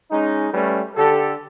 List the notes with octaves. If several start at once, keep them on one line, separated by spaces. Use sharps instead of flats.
G#3 C#4 D#4
G3 A3 C#4 B4
D3 G4 A4